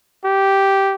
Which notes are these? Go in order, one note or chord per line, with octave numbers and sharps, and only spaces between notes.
G4